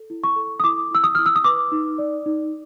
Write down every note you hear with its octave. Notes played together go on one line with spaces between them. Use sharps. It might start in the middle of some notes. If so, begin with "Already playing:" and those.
Already playing: A4
E4
C#6
A4
D#6
E4 D6
E4 E6
D#6
E4 F6
E6
D#6
B4 D6
D#4
D5
D#4